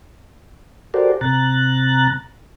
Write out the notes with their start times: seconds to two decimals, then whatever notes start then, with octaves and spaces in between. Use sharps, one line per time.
0.94 F#4 G4 A4 A#4 C5 D5
1.21 C3 A#5 F#6 A6